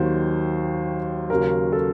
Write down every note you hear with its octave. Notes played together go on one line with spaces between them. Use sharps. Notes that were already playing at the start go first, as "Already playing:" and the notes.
Already playing: D#2 D#3 F#3 C5
D#2 C#3 F#3 A#4
A4